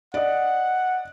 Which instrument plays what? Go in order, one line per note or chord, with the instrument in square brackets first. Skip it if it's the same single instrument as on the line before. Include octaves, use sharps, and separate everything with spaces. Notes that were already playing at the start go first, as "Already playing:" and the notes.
[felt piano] D5 D#5 [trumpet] F#5